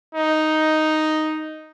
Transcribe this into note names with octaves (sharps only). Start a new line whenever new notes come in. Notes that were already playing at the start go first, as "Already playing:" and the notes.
D#4